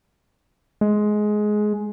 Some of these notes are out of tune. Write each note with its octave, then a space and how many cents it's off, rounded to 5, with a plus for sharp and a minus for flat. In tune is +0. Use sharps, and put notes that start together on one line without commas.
G#3 +15